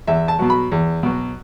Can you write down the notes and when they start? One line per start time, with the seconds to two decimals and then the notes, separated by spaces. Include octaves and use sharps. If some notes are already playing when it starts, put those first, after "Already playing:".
0.07 E2 E5
0.28 A5
0.39 B2 F#3
0.50 B5
0.72 E2
1.03 B2 F#3